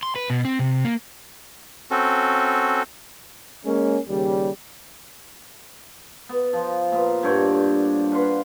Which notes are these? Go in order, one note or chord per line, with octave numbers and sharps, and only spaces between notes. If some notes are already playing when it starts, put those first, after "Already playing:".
C6
B4
B2
C4
C3
A#3
C4 C#4 F#4 A4
G#3 A#3 C#4
D#2 C#3 G3
B3
F3
A#2 B3
G2 D3 C#5 G5
B4 F5 F#5 C6